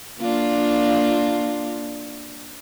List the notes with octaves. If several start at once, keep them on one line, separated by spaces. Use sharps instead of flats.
A#3 D4 F4